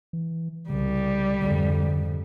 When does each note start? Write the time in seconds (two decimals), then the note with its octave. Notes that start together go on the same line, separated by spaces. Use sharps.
0.13 E3
0.70 C2 C#3 G3
1.42 F2 G#2 D3